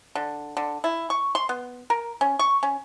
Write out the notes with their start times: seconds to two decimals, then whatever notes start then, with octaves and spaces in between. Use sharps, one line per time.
0.15 D3
0.57 D3
0.84 E4
1.10 C#6
1.35 C6
1.49 B3
1.90 A#4
2.21 C#4
2.39 C#6
2.63 C#4